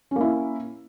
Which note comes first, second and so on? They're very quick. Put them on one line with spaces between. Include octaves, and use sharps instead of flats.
C#4 A#3 E4